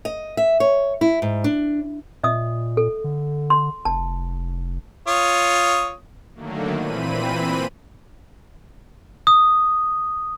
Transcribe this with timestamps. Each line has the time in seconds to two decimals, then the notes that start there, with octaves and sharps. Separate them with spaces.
0.05 D#5
0.37 E5
0.60 C#5
1.01 E4
1.22 G#2
1.44 D4
2.24 A#2 D#5 E5 D#6
2.77 A4
3.04 D3
3.50 C6
3.85 F1 A5
5.07 F4 C#5 D#6
6.35 D3 D#3 F#3 A3 A#3
6.74 A#2 E3 C4 B5 D#7
9.27 D#6